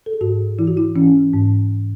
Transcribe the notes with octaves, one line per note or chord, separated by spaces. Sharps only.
A4
G#4
G#2 F#4
E3 E4
F#4
E4
E3 C#4
G#2